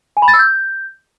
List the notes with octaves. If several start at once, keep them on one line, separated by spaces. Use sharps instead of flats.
G#5
B5
A6
E6
G6